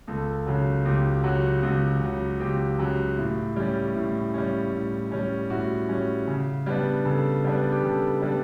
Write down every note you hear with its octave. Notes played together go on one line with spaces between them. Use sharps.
C#2 A4
C#3 F#3
C#2 G4
C#3 F#3 F#4
C#2 F#4
C#3 F#3
C#2 G4
C#3 F#3
A2
G3 C#4
A2
G3 C#4
A2
G3 C#4
A2 F#4
G3 C#4
C#3
G3 B3 D4
C#3 A4
G3 B3 D4
G4
C#3 A4
G3 B3 D4